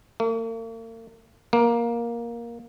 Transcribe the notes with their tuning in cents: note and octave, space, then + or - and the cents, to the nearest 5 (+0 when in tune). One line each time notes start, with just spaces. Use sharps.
A#3 -45
A#3 +10